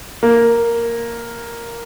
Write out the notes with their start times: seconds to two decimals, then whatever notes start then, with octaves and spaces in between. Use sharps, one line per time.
0.23 A#3